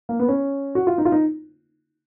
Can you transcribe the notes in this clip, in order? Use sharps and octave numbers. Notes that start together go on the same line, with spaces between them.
A#3
B3
C#4
F#4
F4
D#4
F4
D#4